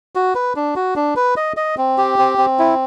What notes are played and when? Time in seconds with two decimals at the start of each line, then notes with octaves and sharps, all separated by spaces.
0.15 F#4
0.35 B4
0.56 D4
0.76 F#4
0.96 D4
1.16 B4
1.37 D#5
1.57 D#5
1.78 C4
1.98 G4
2.19 C4
2.38 C4
2.59 E4